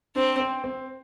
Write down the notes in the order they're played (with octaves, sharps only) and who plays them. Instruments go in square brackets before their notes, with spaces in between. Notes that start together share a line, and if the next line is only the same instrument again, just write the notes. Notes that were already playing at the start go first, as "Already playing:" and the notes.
[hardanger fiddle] C4 [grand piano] D4
[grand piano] C4
C4